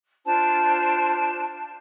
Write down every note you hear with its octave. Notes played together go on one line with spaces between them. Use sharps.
D4 F4 C5 A5